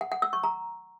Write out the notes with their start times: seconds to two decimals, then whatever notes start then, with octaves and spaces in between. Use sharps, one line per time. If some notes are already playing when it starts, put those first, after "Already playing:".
0.01 F#5
0.12 F#5
0.22 E6
0.33 C#6
0.44 A#5